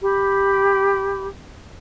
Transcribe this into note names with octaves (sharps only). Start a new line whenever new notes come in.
G4 B5